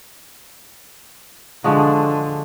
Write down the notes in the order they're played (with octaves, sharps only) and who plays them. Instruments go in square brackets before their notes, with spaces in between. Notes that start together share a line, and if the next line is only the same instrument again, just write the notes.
[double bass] D3 [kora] F3 G#3 F#4